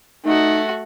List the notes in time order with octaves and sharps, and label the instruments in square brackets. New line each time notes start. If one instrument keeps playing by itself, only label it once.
[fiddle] A3 F#4 [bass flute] D#4